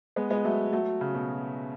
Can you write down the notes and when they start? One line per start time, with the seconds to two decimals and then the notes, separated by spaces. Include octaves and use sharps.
0.16 G#3 B3
0.31 G#3 B3
0.44 F#3 A3
0.72 F#3 A3
1.01 C#3
1.14 B2